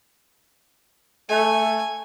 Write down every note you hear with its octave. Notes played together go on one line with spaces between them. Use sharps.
A3 G#5